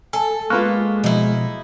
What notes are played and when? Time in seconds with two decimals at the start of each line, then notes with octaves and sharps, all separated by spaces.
0.13 A4 G#5 A5
0.50 G#3 A#3 B3 F4 C#6 F6 F#6
1.04 B2 F3 D#4 E4